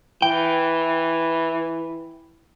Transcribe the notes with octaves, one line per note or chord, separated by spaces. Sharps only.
E3 G5